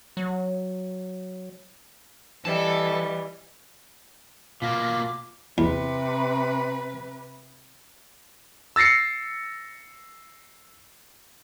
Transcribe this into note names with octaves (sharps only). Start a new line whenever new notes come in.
F#3
E3 G3 A4 D#5
B2 A#3 F4 D6
E2 C3 B4
E6 A6 A#6 C7 C#7